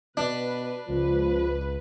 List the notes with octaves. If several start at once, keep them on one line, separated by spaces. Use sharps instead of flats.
B2 D4 B4
C#2 F3 B4